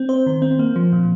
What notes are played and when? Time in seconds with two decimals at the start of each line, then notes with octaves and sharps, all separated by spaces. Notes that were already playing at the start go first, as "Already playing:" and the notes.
Already playing: C4
0.09 C5
0.26 D#3
0.42 C4
0.59 A#3
0.76 F3
0.92 A#2